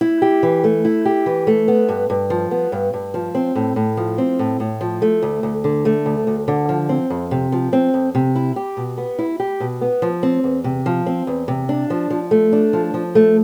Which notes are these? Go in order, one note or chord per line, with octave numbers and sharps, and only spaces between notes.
E4
G4
E3
A3
E4
G4
E3
A3
B3
G2
G2
F3
B3
G2
G2
F3
C4
A2
A2
F3
C4
A2
A2
F3
A3
D2
D2
D3
A3
D2
D2
D3
F3
C4
F2
C3
F3
C4
F2
C3
E4
G4
B2
B3
E4
G4
B2
B3
F3
C4
E2
C3
F3
C4
E2
C3
D4
F3
F3
A3
D4
F3
F3
A3